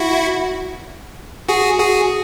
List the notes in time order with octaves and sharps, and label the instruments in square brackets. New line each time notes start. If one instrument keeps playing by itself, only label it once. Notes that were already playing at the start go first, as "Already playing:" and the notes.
Already playing: [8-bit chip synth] E4 F#4
F#4 G#4
F#4 G#4